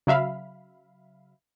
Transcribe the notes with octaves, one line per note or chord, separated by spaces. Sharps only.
C#3 F#3 E5 F5 B5